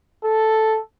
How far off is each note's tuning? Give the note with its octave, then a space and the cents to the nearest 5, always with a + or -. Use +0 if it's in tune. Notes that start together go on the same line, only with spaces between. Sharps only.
A4 +0